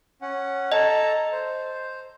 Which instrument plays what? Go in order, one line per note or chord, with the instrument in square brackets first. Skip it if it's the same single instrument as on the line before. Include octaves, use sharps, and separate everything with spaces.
[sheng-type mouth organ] C#4 F#5
[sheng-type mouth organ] A4 A5 A#5 [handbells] D#5
[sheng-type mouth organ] C5